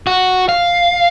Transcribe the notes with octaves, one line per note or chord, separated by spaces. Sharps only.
F#4
F5